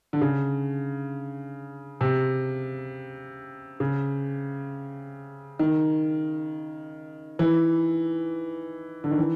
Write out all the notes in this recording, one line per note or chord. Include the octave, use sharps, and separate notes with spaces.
D3
C#3
C3
C#3
D#3
E3
D3
D#3
E3